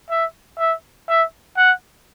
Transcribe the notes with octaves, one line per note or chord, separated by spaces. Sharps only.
E5
E5
E5
F#5